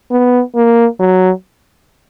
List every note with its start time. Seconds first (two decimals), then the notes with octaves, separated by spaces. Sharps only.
0.11 B3
0.56 A#3
1.00 F#3